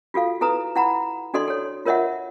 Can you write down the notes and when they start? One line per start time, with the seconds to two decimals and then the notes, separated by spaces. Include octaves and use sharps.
0.14 F4 F#4 A4 F5
0.41 E4 A4 B4 A#5 D#6
0.76 E4 F#5 A#5 B5
1.34 D4 F#4 A4 D5 D#5 C6
1.48 A4 C#5
1.85 F4 A#4 C#5 D#5 E5 F#5